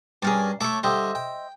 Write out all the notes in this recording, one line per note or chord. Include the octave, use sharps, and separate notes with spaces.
G2 C#4 G#4 A#4 D5
A3 C#5 E5 A5 D6
D3 G3 C5 D#5 E5
G5